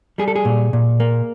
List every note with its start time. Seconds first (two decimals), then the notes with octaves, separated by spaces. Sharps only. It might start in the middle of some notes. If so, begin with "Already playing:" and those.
0.18 G3 G#4
0.28 A4
0.36 G#4
0.45 A#2
0.73 A#2
1.00 A#3